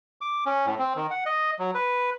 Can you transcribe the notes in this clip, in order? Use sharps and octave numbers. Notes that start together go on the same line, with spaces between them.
D6
C#4
A2
C4
D#3
F#5
D#5
F#3
B4